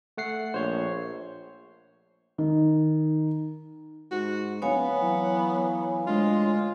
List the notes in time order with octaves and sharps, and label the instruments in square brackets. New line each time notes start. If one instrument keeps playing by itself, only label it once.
[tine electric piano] A3 F#5 C7
[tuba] A#1 [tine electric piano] C5 C#5
[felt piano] D#3
[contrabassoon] G#2 [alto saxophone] F#4
[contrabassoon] D1 [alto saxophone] B3 [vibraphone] C#5 F5 G#5
[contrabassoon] E3 [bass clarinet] F#3
[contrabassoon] D2 [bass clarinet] G#3 [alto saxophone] F4